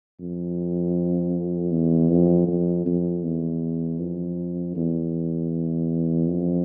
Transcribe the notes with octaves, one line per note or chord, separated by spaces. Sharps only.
F2
E2
F2
F2
F2
E2
F2
E2
F2